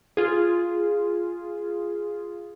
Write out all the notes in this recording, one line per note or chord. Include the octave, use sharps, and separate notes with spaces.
F4 G#4